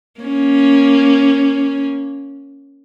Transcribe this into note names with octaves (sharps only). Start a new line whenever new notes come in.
A#3 C#4